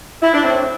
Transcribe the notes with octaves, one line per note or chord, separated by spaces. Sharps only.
E4
D4
A2 C4